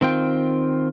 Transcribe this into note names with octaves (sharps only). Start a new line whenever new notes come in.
D#3 C4 F4 G5